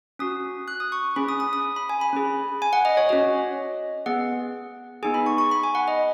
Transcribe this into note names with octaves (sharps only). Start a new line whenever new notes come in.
C#4 F#4 D#6
F#6
D#6
C#6
C#4 G#4 B5
D#6
D#6
D#6
B5
G#5
B5
C#4 G#4
G#5
F#5
D#5
C#5
C#4 F#4 D#5
B3 G#4 F#5
B3 D#4 G#4 G#5
B5
C#6
C#6
B5
G#5
F#5
D#5